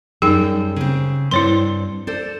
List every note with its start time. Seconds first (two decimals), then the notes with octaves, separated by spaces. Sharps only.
0.22 F#2 G3 D#4 G#4 G5
0.76 C#3 C4
1.31 G2 C4 E4 C#5 C6
2.07 A4 C5 D5